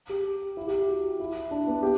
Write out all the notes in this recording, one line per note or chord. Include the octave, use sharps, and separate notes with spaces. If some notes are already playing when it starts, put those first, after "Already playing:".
G4
E4
G4
G4
F#4
E4
D4
B3
G4